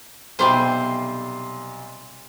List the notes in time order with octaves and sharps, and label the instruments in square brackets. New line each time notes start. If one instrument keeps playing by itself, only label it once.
[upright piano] B1 C6 [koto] C3 G3 C5